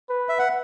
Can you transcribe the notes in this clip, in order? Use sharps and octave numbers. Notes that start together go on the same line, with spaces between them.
B4
E5
F#5